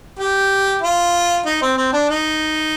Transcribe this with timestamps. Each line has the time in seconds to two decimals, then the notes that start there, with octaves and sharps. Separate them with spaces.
0.19 G4
0.82 F4
1.45 D#4
1.62 C4
1.77 C4
1.93 D4
2.09 D#4